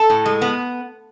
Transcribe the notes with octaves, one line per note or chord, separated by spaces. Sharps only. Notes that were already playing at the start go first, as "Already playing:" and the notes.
Already playing: A4
A2
G#3
B3